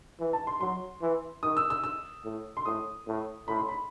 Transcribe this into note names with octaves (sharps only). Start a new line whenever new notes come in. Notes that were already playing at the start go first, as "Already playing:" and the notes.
E3
A5
C6
F#3 C6
E3
D#3 D#6
E6
E6
E6
A2
C6
A2 D#6
A2
A2 B5
C6
B5